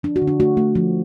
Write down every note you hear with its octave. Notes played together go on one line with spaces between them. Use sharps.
F3 D4
F#4
D3
D4
A3 F#4
A3
F3